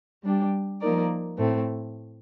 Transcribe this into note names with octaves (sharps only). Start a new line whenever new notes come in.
G3 D4 G4
F3 A#3 D#4 A#4 D5
A2 A3 C4